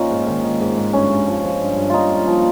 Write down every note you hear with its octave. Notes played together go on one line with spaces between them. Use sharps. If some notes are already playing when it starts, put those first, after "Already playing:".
Already playing: A#2 F3 C#4 D#4 F4
G#2
D#3
D#3
G#2
G#2
G2 C#4
G2
F3
F3
G2
G2
A#2 D#4 F4
A#2
F3